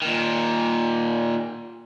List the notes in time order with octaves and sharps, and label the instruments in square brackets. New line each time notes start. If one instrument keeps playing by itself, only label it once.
[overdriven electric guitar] A#2 D#3